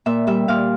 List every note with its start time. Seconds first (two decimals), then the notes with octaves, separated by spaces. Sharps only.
0.06 A#2 E5
0.27 G3 E5
0.48 A#2 F5